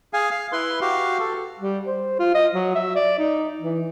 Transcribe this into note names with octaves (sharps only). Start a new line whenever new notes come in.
G#4 F5 G#5
F5
E4 B4 C6
F#4 G4 F5
A4
G3
C5
F4
D#5
F#3
E5
D5
D#4
E3